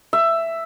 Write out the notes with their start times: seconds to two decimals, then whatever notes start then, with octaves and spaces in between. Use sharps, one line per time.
0.13 E5